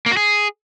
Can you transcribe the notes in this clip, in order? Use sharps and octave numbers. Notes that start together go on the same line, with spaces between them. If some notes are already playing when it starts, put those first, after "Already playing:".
A#3
F#4
G#4